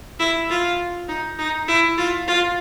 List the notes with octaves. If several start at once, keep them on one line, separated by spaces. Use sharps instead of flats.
E4
F4
D#4
D#4
E4
F4
F4